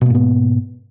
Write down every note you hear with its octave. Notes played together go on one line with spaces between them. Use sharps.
G#2 B2 A#3 B3